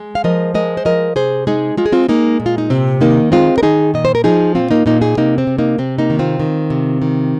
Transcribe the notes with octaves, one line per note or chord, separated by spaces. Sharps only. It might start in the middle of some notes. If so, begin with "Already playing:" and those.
Already playing: G#3
F5
F3 A#4 D#5
G#3 A#4 D#5
C5
F3 A#4 D#5
C3 G#4 C5
G#3 D#4 G#4
G#3 F4
G#4
C4 F4
G#3 A#3 D#4
A#2
F4
D#4
C3 C4
D#3 A#3 D#4
G#3 C4 F4
A#4
D#3 D#4 G#4
A#2 D#5
C5
A#4
F3 D#4 G#4
A#2 C4 F4
A#3 D#4
A#2 A#3 D#4
D#4 G#4
C3 A#3 D#4
C4
C3
A#3 D#4
C3 C4
A#3 D#4
D#3
C4 F4
D#3
C3
D#3